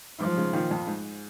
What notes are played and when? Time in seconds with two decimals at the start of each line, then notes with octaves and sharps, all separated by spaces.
0.20 G#2 F3
0.37 G#2 C#3
0.53 A#2 D#3
0.71 F2 A#2
0.87 G#2